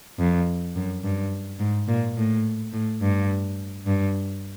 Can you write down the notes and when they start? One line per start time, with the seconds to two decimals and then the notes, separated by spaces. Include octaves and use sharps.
0.19 F2
0.76 F#2
1.03 G2
1.59 G#2
1.88 A#2
2.17 A2
2.73 A2
3.01 G2
3.86 G2